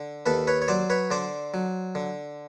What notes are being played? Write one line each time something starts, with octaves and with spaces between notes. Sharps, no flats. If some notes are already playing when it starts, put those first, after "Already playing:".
Already playing: D3
D#2 A4 B4
B4 C#5
C#5
F#3 C5 D5
B4 C#5
D3 C5 D5
F#3
D3